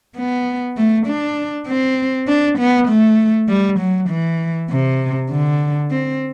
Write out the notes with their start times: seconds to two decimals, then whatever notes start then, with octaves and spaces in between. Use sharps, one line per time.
0.16 B3
0.77 A3
1.07 D4
1.67 C4
2.27 D4
2.58 B3
2.88 A3
3.48 G3
3.79 F#3
4.10 E3
4.69 C3
5.31 D3
5.91 C4